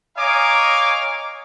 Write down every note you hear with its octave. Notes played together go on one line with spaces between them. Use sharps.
C#5 D#5 F5 G#5 A#5 D6